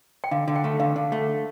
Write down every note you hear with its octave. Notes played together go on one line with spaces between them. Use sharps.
G5
D3 F5
D3
G5
A3
D3 F5
D3
A3